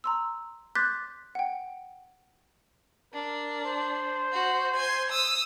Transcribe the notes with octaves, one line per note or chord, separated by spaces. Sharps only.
A#5 C6 E6
C6 D6 F#6 G6 A6 B6
F#5 G5
D4 A#4
C5
F#4
G#5 C6
D#6 E6